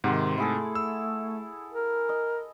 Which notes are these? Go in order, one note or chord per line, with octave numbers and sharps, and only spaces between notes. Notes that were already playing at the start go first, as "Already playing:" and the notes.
G#2 C3 D#3 F#5 C6
A3 E4 G#4 A4
E6
A#4
D#5